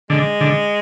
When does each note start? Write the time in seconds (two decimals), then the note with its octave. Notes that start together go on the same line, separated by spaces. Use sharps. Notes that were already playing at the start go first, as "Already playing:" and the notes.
0.10 D3 G#3
0.41 D3